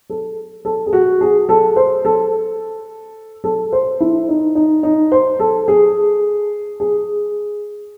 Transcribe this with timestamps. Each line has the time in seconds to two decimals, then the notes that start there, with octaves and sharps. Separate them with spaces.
0.10 A4
0.65 A4
0.86 G#4
0.93 F#4
1.21 G#4
1.49 A4
1.76 C5
2.05 A4
3.44 A4
3.73 C5
4.00 E4
4.29 D#4
4.55 D#4
4.83 D#4
5.12 C5
5.40 A4
5.68 G#4
6.80 G#4